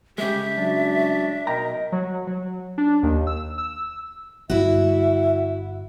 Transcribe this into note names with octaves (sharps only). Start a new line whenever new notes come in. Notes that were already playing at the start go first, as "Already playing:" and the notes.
C#3 G#3 G4 E5
F#3 D4
B1 A#4 D#5 G5 A#5
F#3
F#3
D4
D#2
E6
E6
G1 G2 E4 F#4 E5